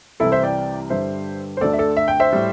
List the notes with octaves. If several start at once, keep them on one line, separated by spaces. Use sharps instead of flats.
C2 C3 E3 G3 E4 A4
C5 E5
D5 G5
G2 D3 G3 C5 E5
C5
D2 D3 A3 A4 D5
E5
A4 D5
E5
G5
C5 E5
A2 G3